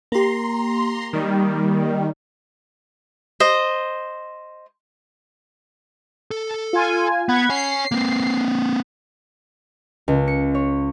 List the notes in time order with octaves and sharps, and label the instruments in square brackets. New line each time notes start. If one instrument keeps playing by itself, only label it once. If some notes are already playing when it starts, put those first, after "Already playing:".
[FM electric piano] A#3 G4 [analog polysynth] A#5 C6
[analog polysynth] D#3 G3
[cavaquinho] C5 D#5
[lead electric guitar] A4
[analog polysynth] F4 G#5
[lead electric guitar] B3 [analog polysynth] F#5 B5 G#6
[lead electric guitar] C#5 G#5 [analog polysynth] C7
[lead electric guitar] A#3 C4
[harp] C#2
C#7
C#5